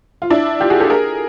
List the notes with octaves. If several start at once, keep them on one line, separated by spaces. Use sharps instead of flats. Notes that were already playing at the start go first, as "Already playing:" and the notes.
F4
D4 E4
F4 G4
F#4 G#4
G4 A4
G#4 A#4